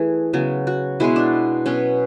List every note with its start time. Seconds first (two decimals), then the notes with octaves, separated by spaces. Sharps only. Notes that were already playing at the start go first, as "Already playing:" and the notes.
Already playing: E3 A3 G#4
0.33 C#3 F#3 B3
0.67 F#4
1.00 B2 G#3 B3 E4
1.16 D4
1.66 B2 F#3 B3 C#4